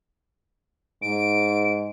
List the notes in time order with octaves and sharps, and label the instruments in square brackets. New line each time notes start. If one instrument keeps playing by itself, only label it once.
[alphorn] G#2 [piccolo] D7